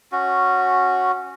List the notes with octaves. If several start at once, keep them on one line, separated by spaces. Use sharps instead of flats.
C#4 F#4